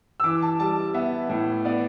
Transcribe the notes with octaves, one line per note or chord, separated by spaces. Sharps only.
E6
E3 D6
A5
G3 A5
B3 E5
A2
B3 D5